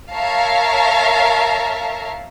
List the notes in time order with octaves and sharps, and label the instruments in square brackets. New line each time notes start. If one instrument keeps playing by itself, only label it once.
[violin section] A#4 C#5 E5 F5 A5 A#5